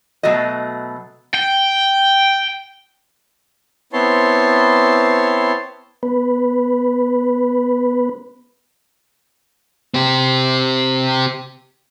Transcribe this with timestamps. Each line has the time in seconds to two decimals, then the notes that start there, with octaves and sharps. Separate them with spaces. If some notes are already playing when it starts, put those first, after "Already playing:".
0.23 B2 F#3 A3 F#4 D#5
1.35 G5
3.93 B3 C4 E4 C#5 A5 C6
6.03 B3 B4
9.94 C4 G4